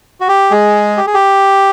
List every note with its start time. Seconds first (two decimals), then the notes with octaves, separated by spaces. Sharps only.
0.21 F#4
0.28 G4
0.51 G#3 G#4
0.97 G4
1.07 G#4
1.14 G4